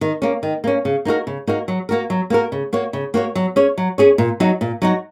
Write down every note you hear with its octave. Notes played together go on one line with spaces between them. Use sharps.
D#3
A#3 C#4
D#3
A#3 C#4
C#3
A#3 D#4 F#4 A#4
C#3
A#3 D#4 F#4 A#4
F#3
A#3 F#4 A#4
F#3
A#3 F#4 A#4
C#3
A#3 F#4 C#5
C#3
A#3 F#4 C#5
F#3
C#4 G#4 C#5
F#3
C#4 G#4 C#5
A#2
F#3 D#4 F#4
A#2
F#3 D#4 F#4